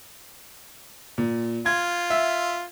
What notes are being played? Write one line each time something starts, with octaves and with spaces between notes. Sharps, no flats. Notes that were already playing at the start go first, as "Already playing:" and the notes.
A#2
F4 G#6
E5